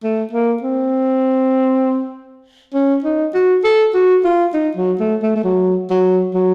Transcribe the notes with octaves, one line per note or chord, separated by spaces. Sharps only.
A3
A#3
C4
C#4
D#4
F#4
A4
F#4
F4
D#4
F#3
A3
A3
A3
F#3
F#3
F#3